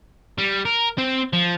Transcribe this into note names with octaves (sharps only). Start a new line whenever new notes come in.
G3
A#4
C4
F3